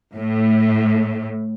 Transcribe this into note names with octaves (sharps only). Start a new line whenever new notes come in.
A2